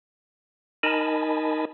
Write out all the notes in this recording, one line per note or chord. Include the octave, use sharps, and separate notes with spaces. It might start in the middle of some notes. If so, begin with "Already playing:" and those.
D#4 A#4 D#5 G#5 A5 B5